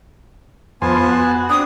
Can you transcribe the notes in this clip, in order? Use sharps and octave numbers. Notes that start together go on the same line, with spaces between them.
F2 B3 C5 G#5 A5
F#4
C4 D4 D#6